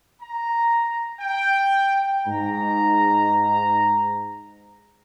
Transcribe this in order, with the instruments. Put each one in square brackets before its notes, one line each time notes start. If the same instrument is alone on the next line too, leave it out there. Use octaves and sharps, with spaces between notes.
[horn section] A#5
G5
[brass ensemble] G#2 A#5